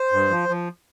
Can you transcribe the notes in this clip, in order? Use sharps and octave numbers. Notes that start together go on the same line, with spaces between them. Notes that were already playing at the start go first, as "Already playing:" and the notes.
Already playing: C5
G2
F3
F3